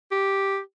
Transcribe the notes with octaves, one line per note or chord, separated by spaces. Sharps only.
G4